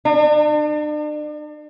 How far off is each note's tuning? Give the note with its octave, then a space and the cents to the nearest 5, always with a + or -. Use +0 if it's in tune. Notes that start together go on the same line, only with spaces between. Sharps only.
D4 +40